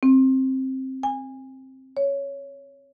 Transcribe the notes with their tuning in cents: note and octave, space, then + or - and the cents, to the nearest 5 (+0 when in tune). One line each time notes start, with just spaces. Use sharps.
C4 +10
G#5 -25
C#5 +5